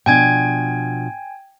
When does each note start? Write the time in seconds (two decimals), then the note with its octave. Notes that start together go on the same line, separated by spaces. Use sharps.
0.06 B2 F3 D4 G5 G#5 G#6